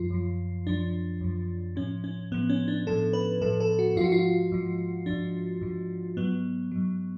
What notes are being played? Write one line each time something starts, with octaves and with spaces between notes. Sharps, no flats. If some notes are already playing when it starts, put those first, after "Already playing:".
Already playing: F#2 F3 F4
F#2 F3
F#2 F3 D4
F#2 F3
A2 F3 C#4
C#4
A2 F3 B3
C#4
D4
A2 F3 A4
B4
A2 F3 A4
A4
F#4
G#2 F3 F4 F#4
F4
G#2 F3
G#2 F3 D4
G#2 F3
G#2 F#3 B3
G#2 F#3